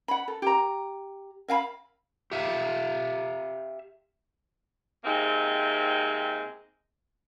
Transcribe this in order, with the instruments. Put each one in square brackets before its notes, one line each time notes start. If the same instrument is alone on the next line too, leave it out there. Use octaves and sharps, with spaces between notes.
[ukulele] F#5 B5
A4
G4 A#5
E5 F5 G#5 B5
[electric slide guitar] G4 E5 F5
[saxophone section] C3 G#3 A#3 C4 D#4